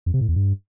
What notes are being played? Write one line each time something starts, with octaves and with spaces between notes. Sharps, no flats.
F2
C3
A2
E2
G2